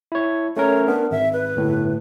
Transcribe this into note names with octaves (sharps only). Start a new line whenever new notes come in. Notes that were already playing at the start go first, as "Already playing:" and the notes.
E4 C#5
A3 C#4 A#4 C#5
B3 D4 A#4
G#1 E5
B4
G1 A2